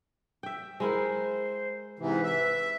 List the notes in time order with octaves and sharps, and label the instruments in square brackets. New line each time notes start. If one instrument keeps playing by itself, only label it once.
[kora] E5 G5
[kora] G#3 E4 A#4 [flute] C5
[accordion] G#2 C3 E3 [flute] B4
[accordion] E5